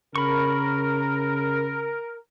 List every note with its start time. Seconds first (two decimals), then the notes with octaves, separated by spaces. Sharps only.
0.16 C#3 A#4 B5 C#6